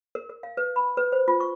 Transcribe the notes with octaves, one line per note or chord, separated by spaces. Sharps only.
A#4
A#4
F5
B4
B5
B4
C5
F4
C#6